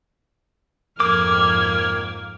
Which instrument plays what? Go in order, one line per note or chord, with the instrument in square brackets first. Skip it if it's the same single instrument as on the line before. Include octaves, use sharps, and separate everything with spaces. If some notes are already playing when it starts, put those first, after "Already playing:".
[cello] F2 G#2 [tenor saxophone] A#3 [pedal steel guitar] D6 [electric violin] F6 G#6